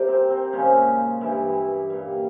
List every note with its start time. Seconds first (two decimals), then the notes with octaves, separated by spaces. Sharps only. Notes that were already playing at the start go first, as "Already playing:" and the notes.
Already playing: C3 G3 G4 A#4 C5
0.08 C4
0.30 C4
0.53 A#2 C#3 F3 G#3 C#4
1.21 G2 E3 G3 E4
1.90 A#2 G3